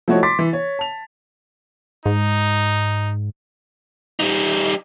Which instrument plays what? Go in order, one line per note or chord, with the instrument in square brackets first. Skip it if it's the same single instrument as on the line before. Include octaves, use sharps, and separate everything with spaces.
[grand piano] F3 A3 E4 F#4 C#5 D#5
C6 D6 A6 B6
E3
C#5
A5 F7
[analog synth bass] G#2 [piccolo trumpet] D#4
[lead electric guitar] G3 D#4